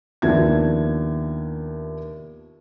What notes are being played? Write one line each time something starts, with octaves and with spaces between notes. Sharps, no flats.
D#2 F3 B3 D4 E5 G#6